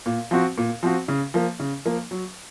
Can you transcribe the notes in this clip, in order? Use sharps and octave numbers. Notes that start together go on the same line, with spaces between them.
A#2
F3 C4 F#4
A#2
F3 C4 F#4
C#3
F3 A#3
C#3
F3 A#3
F#3